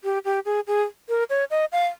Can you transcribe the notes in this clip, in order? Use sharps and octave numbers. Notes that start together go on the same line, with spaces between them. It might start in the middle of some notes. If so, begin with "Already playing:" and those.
G4
G4
G#4
G#4
A#4
C#5
D#5
F5